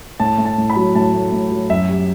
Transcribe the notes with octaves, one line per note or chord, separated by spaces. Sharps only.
A2 A5
A3
A5
A2
B5
F#3
A2 A5
A3
A2
F#3
F#2 E5
G3